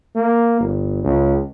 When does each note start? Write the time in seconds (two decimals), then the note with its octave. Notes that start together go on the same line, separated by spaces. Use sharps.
0.16 A#3
0.60 G1
1.04 C#2